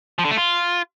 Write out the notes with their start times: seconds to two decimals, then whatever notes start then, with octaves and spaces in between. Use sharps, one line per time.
0.19 F3
0.25 D3
0.31 A3
0.37 F4